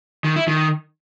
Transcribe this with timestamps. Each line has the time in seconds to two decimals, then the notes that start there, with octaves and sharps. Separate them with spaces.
0.24 D#3
0.36 E4
0.48 D#3